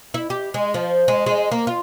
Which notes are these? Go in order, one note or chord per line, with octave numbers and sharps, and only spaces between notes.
E4
G4
G#3
F3
G#3
G#3
A#3
F4